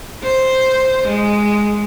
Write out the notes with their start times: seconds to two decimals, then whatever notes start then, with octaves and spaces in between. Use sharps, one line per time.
0.23 C5
1.08 G#3